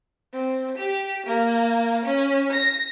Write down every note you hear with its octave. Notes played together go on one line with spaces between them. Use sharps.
C4
G4
A#3
C#4
A#6